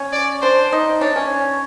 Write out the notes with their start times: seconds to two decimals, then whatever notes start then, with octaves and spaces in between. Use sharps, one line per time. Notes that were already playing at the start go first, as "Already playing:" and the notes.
Already playing: C#4
0.13 D5
0.42 D4 C5
0.72 D#4
1.01 D4 C#5
1.16 C#4